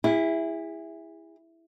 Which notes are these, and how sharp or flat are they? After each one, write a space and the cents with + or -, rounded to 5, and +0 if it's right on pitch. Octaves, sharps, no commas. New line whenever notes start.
E4 +0 G#4 -35